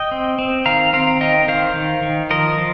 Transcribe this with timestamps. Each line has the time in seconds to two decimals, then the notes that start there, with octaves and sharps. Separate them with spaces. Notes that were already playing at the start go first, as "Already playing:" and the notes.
Already playing: D#5 G5
0.11 C4
0.39 C4
0.66 D#3 F5 A#5
0.93 C4 F5 A#5
1.21 D#3 D#5 G5
1.48 D#3 C5 F5
1.76 D#3
2.03 D#3
2.30 F3 A#4 D#5
2.58 F3